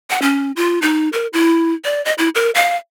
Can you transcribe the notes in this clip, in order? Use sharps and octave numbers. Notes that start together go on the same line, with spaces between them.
F#5
C#4
F4
D#4
A#4
E4
D5
D#5
E4
A#4
F5